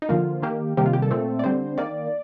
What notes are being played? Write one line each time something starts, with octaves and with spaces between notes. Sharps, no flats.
D#4
D3 F3 A#3 F4
D#3 A#3 G4
C3 D#3 G3 A#3 G4
F4
G4
A4
A#2 A3 C4
D5
D3 G3 C4 C5
D#3 A#3 D5